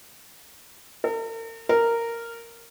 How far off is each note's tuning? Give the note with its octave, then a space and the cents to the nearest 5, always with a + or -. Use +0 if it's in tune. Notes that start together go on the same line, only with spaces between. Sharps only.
A#4 -45
A#4 -10